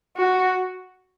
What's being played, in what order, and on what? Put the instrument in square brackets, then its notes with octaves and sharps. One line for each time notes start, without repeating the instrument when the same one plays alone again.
[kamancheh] F#4